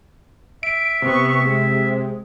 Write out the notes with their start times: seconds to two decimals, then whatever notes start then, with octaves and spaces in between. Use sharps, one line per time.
0.63 E5 D7
1.02 C3 B3 C#6
1.44 G#3